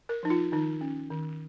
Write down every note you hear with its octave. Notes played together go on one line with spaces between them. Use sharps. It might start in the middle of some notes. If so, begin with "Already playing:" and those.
A#4
F3 D#4
F4
D#3 D#4
C#4
D#3